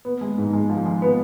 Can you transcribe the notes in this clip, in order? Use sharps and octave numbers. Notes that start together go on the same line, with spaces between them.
B3
G#3
G#2
G#3
F3
G#3
B3